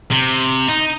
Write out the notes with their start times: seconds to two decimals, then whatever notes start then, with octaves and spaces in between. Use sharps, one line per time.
0.11 C3
0.69 D#4